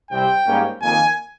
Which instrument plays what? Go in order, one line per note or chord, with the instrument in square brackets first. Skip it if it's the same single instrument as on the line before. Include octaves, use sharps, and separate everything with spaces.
[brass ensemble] C2 C3 G3 C4 G5
G#2 G3 A#3 C#4
F2 D#3 A#3 G#5